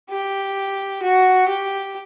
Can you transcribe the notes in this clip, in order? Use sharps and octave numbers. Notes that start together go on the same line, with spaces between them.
G4
F#4
G4